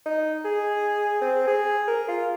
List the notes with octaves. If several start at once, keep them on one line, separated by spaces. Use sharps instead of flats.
D#4
G#4
C4
G#4
A#4
F4